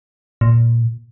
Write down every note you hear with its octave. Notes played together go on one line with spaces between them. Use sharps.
A#2